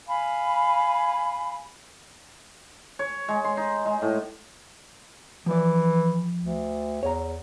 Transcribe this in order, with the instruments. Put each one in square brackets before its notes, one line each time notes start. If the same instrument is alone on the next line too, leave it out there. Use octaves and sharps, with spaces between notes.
[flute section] F5 G#5 B5
[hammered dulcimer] C#5
G#3
C6
D#4
G#3
A2
[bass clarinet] E3 [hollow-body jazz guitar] F3 D5
[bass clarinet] D2
[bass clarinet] E2 [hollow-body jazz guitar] C#5 A#5